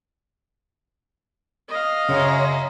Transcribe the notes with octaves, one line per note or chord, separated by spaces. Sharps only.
D#5 F5
F#2 C#3 C#5